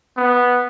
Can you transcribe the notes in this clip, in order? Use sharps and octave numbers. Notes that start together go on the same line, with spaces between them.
B3